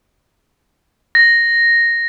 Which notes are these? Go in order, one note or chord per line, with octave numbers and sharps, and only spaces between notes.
A#6